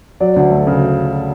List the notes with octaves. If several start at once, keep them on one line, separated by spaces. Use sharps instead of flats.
F#3 D5
D2
A3
C#3